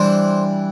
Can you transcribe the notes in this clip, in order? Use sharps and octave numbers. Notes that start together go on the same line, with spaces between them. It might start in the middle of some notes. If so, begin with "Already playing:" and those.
Already playing: E3 G3 D4 C5